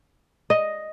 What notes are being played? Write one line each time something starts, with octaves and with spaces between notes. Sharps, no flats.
D#5